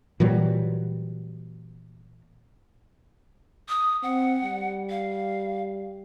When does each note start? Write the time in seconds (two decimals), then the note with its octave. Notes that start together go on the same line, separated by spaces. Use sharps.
0.20 A#2 E3 F#3 G3
3.69 D#6
4.03 C4 F#5
4.44 G3
4.90 F5